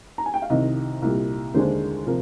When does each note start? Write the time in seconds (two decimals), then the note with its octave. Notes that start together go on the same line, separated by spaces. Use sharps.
0.18 A#5
0.26 G#5
0.34 G5
0.42 F5
0.50 C2 C3 D#3 D#5
1.02 C2 A#2 G3
1.54 D#2 D3 G#3 D4 C5
2.07 C3 F3 A#4